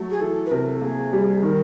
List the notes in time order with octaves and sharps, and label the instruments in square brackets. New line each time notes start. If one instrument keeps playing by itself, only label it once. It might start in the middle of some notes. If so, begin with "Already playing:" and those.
Already playing: [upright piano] F#3 A3
[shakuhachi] G#4
[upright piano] E3 [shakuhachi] A4
[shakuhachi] B4
[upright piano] C3 [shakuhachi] A#4
[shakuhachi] A4
[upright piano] A#3 [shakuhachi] G#4
[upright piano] G3
[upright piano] D#3 [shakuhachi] A#4